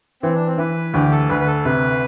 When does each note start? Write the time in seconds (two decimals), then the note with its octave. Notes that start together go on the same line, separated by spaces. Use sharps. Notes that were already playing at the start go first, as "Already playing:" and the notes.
0.23 E3 C4
0.35 D4
0.47 C4
0.58 E3 B4
0.94 D2 G4
1.11 A4
1.29 D2 B4
1.40 B4
1.47 A4
1.65 C3 B4